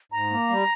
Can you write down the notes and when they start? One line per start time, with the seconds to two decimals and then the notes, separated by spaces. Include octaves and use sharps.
0.12 G#2 A#5
0.31 A#3
0.49 G3